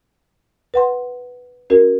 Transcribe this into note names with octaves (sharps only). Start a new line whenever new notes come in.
B4 F#5 C6
C#4 F#4 A#4